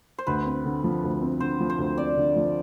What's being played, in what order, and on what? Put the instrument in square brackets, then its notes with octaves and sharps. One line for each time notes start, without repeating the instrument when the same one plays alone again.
[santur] C5
[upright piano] D2 [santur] B4
[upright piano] C4
D3
F3
D2
C4
[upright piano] D3 [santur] C5
[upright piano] F3
[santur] C5
[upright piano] D2
[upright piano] C4 [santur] D5
[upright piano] D3
F3